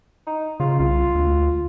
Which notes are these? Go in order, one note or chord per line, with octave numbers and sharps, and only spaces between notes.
D#4
C#3 F4
C2 F4
D2